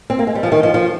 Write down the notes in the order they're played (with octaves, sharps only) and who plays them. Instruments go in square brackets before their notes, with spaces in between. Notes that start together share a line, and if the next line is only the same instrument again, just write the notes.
[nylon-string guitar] C4
A#3
G#3
G3
F3
D#3
F3
F3